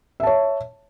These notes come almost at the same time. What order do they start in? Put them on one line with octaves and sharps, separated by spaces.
E5 A5 C#5